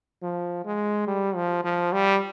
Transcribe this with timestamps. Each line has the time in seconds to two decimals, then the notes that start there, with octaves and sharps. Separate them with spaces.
0.23 F3
0.65 G#3
1.07 G3
1.36 F3
1.64 F3
1.93 G3